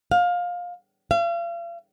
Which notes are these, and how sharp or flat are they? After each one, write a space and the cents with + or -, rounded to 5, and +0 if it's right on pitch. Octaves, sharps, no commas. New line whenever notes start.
F5 +20
F5 -40